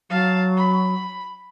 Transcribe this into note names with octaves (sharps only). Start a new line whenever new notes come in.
F#3 F5 A5
B5